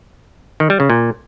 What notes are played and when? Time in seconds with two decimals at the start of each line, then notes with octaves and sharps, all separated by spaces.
0.60 D#3
0.70 G3
0.80 C#3
0.90 A#2